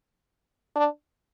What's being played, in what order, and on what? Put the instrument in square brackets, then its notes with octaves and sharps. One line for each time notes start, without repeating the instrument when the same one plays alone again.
[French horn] D4